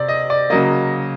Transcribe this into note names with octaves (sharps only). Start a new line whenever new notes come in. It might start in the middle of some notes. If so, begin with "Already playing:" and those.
Already playing: C3 D5
D#5
D5
C#3 F#3 A#3 D#5